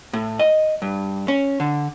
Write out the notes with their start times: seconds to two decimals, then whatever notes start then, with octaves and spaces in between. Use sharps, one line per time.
0.13 A2
0.39 D#5
0.82 G2
1.28 C#4
1.60 D3